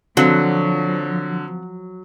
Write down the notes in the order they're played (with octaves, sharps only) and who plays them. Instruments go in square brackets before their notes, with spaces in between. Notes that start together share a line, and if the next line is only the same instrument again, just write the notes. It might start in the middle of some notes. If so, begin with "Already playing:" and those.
[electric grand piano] D3 [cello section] F3 [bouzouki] F#3 [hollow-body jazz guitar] C4 F#4 F5